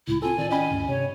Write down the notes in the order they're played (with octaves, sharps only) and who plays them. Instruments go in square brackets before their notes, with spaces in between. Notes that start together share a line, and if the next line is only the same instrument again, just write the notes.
[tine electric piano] C#2 A2 [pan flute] E4
[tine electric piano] C4 A4 [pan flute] F4 [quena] G#5
[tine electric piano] D#3 [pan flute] D5
[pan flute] C#4 [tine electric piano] D#5 G5 B5 [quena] G#5
[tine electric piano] D2 G2
[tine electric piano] C3 [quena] C#5